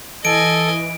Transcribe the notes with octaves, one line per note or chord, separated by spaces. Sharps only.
E3 A4 D#5 G#5 D7